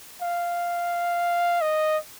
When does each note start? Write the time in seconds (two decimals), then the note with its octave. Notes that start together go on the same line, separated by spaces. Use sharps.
0.22 F5
1.61 D#5